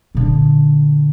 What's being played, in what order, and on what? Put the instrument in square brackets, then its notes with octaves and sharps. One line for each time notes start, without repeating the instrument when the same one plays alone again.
[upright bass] A#2 D3